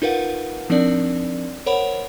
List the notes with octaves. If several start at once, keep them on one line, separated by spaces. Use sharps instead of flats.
D#4 F4 A#4 B4 F5 F#5
F3 C4 D4 D#4 A#4 D5
A#4 C5 C#5 F#5 B5